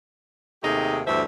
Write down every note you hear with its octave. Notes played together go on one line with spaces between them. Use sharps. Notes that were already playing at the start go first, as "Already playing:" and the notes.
D#2 C3 A3 D#4 G4 G#4
D2 G2 E3 A4 C5 E5